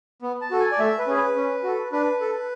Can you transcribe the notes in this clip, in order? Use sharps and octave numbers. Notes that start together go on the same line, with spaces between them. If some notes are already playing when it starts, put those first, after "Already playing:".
B3
A5
F#4 A4
G#5
D5
A3 E5
B4
C#4 G#4
B4
C#4
F#4 A4
D4 B4
A4